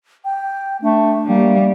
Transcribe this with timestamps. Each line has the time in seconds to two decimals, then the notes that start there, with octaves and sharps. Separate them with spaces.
0.25 G5
0.82 A3 D4
1.27 G3 A#3